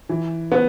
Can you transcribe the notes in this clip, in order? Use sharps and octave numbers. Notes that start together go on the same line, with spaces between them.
E3
B3